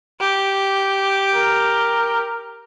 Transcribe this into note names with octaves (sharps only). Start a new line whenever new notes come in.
G4
A#4